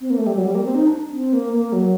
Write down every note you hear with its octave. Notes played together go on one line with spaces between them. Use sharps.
C4
A#3
A3
G3
F#3
G3
A#3
C4
D#4
D4
C4
A#3
A#3
F#3